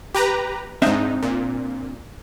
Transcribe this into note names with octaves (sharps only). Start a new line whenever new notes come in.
G4 B4 A#5
G#2 C4 D4 D#4 E5
A#2